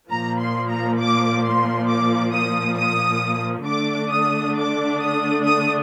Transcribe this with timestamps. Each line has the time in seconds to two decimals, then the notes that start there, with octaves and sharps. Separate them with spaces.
0.10 A#2 F3 A#3 A#5
0.40 C6
0.69 A#5
0.99 D6
1.44 C6
1.88 D6
2.33 D#6
2.77 D#6
3.66 D3 A3 D4 D6
4.11 D#6
4.56 D6
5.00 D#6
5.44 D#6